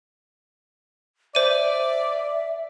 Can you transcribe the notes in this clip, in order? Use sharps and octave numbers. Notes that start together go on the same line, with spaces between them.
C5 D5 E5 D#7